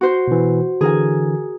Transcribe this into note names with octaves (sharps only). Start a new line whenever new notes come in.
F#4 C5 G6
B2 E3
D3 E3 G#4 A#4 G#5